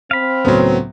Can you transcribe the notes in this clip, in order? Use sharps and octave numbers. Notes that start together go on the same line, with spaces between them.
C4 F5 B5
C#2 A2 F#3 B3 C5